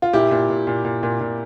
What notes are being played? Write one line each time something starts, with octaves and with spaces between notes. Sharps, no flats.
F4
A#2 E4 G4
A#2
A#2
A#2
A#2
A#2
A#2